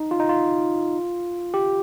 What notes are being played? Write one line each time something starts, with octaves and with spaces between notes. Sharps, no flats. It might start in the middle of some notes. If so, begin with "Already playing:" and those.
Already playing: D#4
F4
D#4
F4
G4